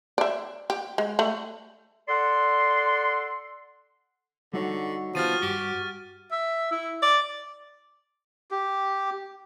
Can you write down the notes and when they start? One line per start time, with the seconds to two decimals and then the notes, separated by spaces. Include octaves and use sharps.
0.18 D5 E5
0.70 G4
0.98 G#3
1.19 A3
2.09 A4 D5 F#5 C6
4.53 D3 G3 D#4 F#4 C#5
5.15 D#3 F3 B3 G4 F6 A6 D#7
5.42 G2 G4
6.32 E5
6.72 E4
7.03 D5
8.51 G4